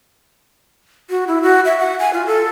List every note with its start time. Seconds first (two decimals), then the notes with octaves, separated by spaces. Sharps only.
1.10 F#4
1.27 E4
1.43 F#4
1.65 E5
1.79 F#5
2.00 G#5
2.14 F4
2.27 A4